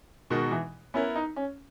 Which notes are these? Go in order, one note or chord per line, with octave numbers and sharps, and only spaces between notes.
B2 D#3 G#3 D#4 F#4
E3
B3 C#4 E4 A#4
D#4
C#4